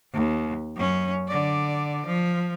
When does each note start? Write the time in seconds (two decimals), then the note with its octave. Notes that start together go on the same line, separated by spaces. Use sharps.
0.13 D#2
0.75 F#2 C#4
1.27 D3 D5
2.06 F3